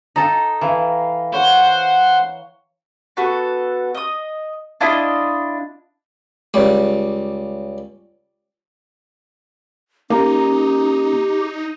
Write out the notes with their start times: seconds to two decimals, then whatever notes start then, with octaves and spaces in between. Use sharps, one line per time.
0.16 D#4 A4 G5 A#5
0.61 E3 F5
1.34 C5 C#5 F#5
3.17 B3 F#4 A4
3.95 D#5 D#6
4.81 D4 E4 F4 D#5
6.54 C#2 G3
10.10 A#3 C#4 D#4 G4 A#5